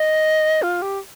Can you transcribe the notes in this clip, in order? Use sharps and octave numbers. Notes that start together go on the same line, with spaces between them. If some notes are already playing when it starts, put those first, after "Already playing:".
Already playing: D#5
F4
G4